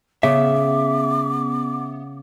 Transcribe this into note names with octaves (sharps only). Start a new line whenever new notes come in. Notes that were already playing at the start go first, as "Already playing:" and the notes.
C#3 B3 E5 D6